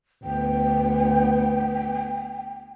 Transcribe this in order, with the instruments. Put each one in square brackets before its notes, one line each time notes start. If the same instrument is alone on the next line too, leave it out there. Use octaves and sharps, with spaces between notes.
[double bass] D2 B3 [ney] G5